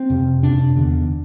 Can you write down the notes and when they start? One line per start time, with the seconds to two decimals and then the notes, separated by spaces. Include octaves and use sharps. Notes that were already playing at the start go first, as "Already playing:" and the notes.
Already playing: C4
0.10 F2 C3
0.43 F2 C3 D4
0.76 E2 D3